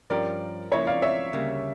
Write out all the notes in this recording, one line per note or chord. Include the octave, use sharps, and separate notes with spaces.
G2 F3 C#4 G4 A#4 D5
C#2 C#3 F3 A#3 E4 C#5 E5
D5 F5
C#5 E5
D2 C#3 G3 A#3